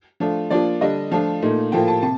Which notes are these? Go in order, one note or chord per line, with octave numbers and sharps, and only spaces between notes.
F3 A3 D4 F4
F3 A#3 D4 F4 D5
D3 G3 D4 D#5
F3 A3 D4 F4 F5
A#2 A3 D#4
A2 F3 A#3 F4 G5
A5
C3 A5